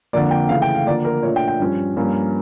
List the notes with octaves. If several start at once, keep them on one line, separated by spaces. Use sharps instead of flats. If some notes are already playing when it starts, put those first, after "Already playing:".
F2 D3 F3 A#3 D5
G5
C#3 E3 A3 F5
G5
F5
D3 F3 A#3 D5
A#4
A#2 A3 D4 C#5
G5
G5
G2 F3 C#4
G2 F3 A#3 C#4